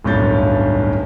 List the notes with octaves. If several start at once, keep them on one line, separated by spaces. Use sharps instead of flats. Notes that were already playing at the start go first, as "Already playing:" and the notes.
D1 B1 G2 C#4 G6 A6